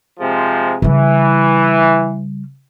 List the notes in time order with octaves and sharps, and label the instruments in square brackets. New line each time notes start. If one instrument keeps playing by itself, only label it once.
[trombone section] C3 F3 G#3
[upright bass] C#3 G3 [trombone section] E3